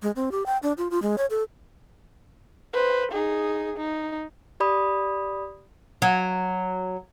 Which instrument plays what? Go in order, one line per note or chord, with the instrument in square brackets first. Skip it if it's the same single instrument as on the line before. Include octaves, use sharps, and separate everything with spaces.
[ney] G#3
C4
G4
G5
D4
F4
F4
G#3
C#5
A4
[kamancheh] B4 C5
D#4 G#4
D#4
[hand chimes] G4 D5 B5 D#6
[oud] F#3